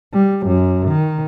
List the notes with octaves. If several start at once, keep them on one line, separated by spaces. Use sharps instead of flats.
G3
F#2
D#3